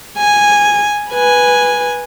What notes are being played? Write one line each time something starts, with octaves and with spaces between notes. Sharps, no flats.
G#5
B4 G#5